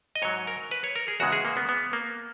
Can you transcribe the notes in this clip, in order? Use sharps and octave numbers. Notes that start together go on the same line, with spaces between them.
D#5
G#2 F#3 C#5
A#4
B4
C#5
A#4
G#4
E2 C#3 G#3 F#4
G#4
A#3
B3
B3
A#3